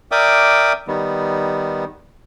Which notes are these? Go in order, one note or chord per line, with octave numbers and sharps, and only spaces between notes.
A#4 D5 E5 G5 D6 D#6
D#3 G3 B3